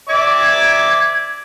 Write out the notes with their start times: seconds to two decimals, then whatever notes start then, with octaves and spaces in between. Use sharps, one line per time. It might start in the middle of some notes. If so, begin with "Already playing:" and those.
0.09 D5 E5 D6 G#6